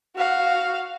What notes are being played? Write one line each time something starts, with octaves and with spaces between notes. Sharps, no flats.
F#4 F5